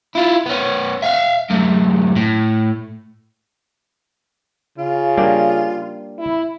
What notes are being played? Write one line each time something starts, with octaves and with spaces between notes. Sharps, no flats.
E4 F4
B3 C#4
E5 F5
F#2 A2
A2
C#3 F4
G3 A#3 D4
E4